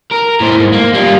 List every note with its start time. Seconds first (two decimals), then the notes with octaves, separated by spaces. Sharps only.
0.11 A#4
0.41 A2 C5
0.60 G#2
0.72 A#3
0.93 G3 F4